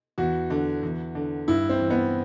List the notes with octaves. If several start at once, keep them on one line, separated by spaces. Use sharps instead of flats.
E2 F#4
D3
E2
D3
G2 E4
C4
E3
B3